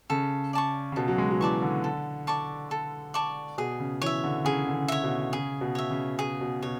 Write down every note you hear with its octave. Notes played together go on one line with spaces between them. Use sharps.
C#3 A4
D5 A5 C#6
C#3
B2 A4
F#3
G#3
F#3
E3 D5 A5 C#6
D3
A4
D5 A5 C#6
A4
D5 A5 C#6
B2 G#4
C#3
E3 C#5 E5
D3
C#3 G#4
D3
C#3
C#5 E5
B2
C#3 G#4
B2
C#5 E5
C#3
G#4
B2
B2 C#5